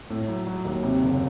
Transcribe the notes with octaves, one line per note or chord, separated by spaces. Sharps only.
A2
F#3
F#3
D#2
C3
F#1